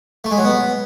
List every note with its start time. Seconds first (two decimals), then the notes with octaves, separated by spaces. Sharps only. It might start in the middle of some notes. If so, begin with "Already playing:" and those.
0.24 A3
0.31 G#3
0.38 F#3
0.44 B3